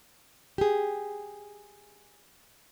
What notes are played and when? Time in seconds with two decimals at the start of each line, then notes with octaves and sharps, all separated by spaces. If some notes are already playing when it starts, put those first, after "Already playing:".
0.58 G4 G#4